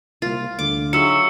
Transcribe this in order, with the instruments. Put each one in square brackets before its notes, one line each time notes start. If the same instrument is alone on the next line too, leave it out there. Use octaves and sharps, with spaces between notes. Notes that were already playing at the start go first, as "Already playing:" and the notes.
[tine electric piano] C2 A#3 [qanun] F4
[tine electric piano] D2 [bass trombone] D3 [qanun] D6
[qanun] F#3 E5 [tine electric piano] D#4 F4 G#4 [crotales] E6 C#7